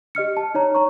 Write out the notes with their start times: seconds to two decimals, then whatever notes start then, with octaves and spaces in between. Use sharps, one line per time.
0.15 G4 D#5 F6 C#7
0.37 A5
0.54 D#4 C#5 A#5
0.74 C#5 A#5 C#6